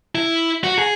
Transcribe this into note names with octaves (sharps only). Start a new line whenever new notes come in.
E4
F#4
G#4